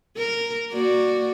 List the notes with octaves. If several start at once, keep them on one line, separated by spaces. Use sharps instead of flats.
A#4
A#3 F#4 D5